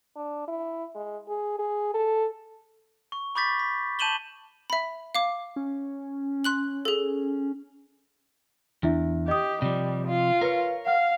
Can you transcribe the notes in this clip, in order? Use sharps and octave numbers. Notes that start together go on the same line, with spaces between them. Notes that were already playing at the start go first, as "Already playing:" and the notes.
D4
E4
G#3
G#4
G#4
A4
C#6
B5 C#6 D6 G6 A6 B6
B6
A5 G6 D#7 E7 F#7 G7
E5 B5
F5 D6
C#4
C6 F#6 F#7
G#4 A4
E2 D4 E4 E5
G4 D#5 D#6
C3 F3 G3
F4
A#4 B4 C#5 F5
F5 F#5 F6